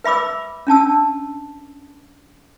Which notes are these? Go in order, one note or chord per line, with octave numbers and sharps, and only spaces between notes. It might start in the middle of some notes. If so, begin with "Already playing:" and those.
B4 E5 B5 D6 E6
C#4 D4 A5 E6